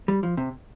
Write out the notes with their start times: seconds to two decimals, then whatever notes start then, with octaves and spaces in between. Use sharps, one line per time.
0.08 G3
0.23 F3
0.37 C3